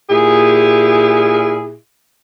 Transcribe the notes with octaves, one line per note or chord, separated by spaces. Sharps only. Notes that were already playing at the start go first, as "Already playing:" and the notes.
A#2 E4 G4 G#4